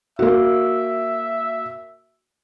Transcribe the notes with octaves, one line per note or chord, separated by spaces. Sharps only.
A#3 F#4 E5